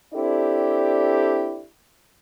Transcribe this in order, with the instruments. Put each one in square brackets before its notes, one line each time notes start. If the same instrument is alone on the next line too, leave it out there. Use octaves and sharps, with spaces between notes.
[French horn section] C4 D4 E4 G4 A4 D5